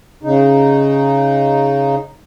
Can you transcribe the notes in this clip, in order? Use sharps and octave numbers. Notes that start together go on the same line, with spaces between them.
C#3 D#4